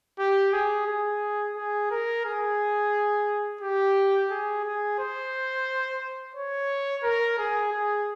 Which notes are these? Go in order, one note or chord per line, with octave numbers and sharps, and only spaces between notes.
G4
G#4
G#4
G#4
A#4
G#4
G4
G#4
G#4
C5
C#5
A#4
G#4
G#4